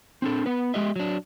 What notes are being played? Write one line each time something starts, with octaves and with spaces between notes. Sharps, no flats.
C4 D4 A4
B3 B4
G#3 G4 D#5 E5
F#3 D4